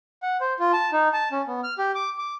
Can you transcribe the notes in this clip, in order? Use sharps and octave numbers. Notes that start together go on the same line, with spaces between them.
F#5
C5
F4
A5
D#4
A5
C#4
B3
F6
G4
D6
D6